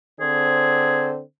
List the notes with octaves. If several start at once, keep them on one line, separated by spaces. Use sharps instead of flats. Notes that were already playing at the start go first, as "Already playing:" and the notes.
D3 C4 G#4 C5